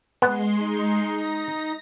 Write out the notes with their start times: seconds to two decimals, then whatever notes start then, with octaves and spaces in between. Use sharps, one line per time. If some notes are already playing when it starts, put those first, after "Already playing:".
0.22 G#3 B3 C6
0.58 D#4
1.15 A#6